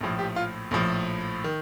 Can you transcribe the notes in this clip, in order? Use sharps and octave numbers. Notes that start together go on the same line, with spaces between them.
A#1 A2 F3
G4
F4
A#1 A2 F3
D#3